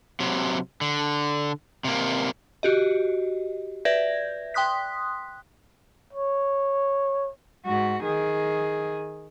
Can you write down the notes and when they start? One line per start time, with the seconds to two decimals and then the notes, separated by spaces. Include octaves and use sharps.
0.20 C3 F#3
0.81 D3
1.84 C3 A#3
2.63 F#4 G4 D#5
3.85 B4 D5 E5 G6 G#6 A#6
4.54 G5 C6 D#6 F#6 B6
6.13 C#5
7.66 G#2 F#4
8.04 D#3 G#4